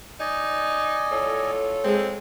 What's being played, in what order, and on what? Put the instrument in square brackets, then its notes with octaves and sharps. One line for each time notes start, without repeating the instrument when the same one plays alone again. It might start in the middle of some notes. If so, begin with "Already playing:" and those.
[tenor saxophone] D#4 [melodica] D5 D#5 G#5
[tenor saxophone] A2 [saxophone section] F4 A4 C#5
[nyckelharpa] G#3 [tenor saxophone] C4